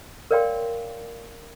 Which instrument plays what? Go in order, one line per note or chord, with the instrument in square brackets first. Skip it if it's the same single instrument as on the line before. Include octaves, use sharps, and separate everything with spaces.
[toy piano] A#4 C#5 D5 F5 G5 C6